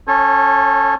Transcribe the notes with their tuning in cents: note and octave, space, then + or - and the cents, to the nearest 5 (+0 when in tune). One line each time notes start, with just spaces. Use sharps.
C#4 +0 A4 +0 C#5 -35